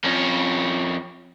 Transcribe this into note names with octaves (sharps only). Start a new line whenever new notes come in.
F2 C#4